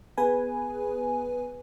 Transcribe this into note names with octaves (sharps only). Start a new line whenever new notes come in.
B3 G#4 B4 G#5